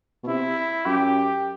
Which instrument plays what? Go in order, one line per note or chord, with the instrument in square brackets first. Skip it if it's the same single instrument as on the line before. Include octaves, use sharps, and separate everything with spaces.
[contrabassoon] B2
[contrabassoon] C3 [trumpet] E4
[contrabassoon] F#2 [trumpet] G4